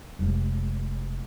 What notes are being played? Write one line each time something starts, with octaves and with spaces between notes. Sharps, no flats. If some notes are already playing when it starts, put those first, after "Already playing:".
F1 G#3